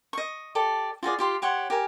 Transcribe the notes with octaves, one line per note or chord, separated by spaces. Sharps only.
D#5 C#6
G4 A4 D5
F4 F#4 G#4 D5
F4 G4 C6
G4 C#5 F#5 C6
G4 A#4 G#5